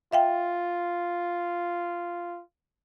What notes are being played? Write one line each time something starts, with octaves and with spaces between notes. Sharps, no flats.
F4 E5 F5 G5